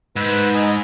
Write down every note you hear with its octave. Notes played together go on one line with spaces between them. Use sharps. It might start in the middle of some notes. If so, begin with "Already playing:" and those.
G#2 B4 E6 F#6
D#5 G#5 A#5